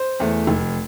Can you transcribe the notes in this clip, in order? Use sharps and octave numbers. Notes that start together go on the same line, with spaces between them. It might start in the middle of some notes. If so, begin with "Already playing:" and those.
Already playing: C5
E2 E3 A3
F1